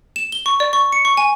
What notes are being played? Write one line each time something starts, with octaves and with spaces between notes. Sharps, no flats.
E7
G7
C#6
D5
C#6
C#7
C#6
G#5